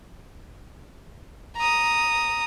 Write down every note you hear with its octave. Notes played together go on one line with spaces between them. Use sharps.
A#5 D#6